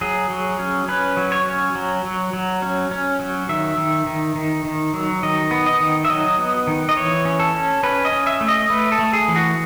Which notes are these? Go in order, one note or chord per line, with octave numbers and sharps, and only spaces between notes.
F#3 G#4
F#3
C#4
C#4 B4
F#3
C#5
C#4
F#3
F#3
F#3
C#4
C#4
F#3
D#3 E5
D#3
D#3
D#3
D#3
F#3
D#3 D#5
B3
D#5
D#3
E5
F#3 D#5
B3
D#3
D#5
E3 C#5
C#4
A4
C#4
C#4 B4
D#5
C#4
E5
A3
D#5
A3 B4
A4
A3
G#4
E3
F#4